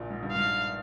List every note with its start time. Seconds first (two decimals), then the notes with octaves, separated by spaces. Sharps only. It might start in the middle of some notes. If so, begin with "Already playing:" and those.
Already playing: A#1 A#2
0.10 G#2
0.23 G2
0.32 G#2 F5